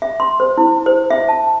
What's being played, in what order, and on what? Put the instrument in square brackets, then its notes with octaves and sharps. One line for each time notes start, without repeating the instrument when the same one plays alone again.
[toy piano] E5
C6
C5
E4
C5
E5
A5